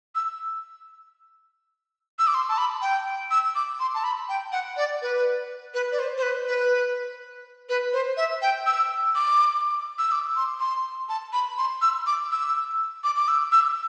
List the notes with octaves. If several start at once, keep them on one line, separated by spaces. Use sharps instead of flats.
E6
E6
D6
C6
A5
B5
G5
E6
D6
C6
A5
B5
G5
F#5
D5
B4
B4
D5
C5
C5
B4
B4
B4
C5
E5
G5
E6
D6
E6
D6
C6
C6
A5
B5
C6
E6
D6
E6
D6
D6
E6
E6